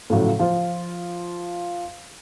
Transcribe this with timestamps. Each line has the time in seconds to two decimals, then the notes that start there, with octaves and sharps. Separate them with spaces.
0.10 A2 C#3 F3 F#3 A3
0.39 F3 F4 C5